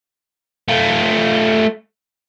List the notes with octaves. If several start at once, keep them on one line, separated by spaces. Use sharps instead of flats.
A3 F4